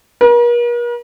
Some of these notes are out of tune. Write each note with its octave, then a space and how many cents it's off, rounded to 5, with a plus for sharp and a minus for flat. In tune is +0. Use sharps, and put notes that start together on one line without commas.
A#4 +45